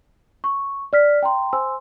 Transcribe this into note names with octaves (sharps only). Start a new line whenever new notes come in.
C#6
D5 F6 B6
G5 A#5 C6
C5 G#5 C6 E6